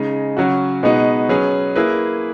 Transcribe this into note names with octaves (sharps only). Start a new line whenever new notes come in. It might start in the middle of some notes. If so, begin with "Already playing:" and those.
Already playing: C#3 G#3 D#4
C#3 F#3 C#4 F#4
B2 G#3 B3 D#4 F#4
F#3 C#4 G#4 B4
A#3 E4 G#4 B4